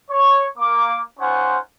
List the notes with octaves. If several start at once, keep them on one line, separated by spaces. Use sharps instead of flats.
C#5
A#3 D6
C#4 D#4 F4 C5 F#5 G#5